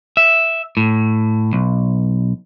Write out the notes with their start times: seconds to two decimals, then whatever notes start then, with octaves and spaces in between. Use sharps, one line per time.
0.17 E5
0.77 A2
1.53 B1